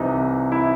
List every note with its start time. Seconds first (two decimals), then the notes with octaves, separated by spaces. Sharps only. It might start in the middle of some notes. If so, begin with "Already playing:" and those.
Already playing: C2 C3 E3 D#4
0.52 E4